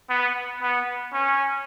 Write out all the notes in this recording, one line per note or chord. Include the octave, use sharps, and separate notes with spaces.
B3
B3
C#4